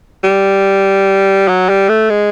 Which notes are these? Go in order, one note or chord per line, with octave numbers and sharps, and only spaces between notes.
G3
F#3
G3
A3
G#3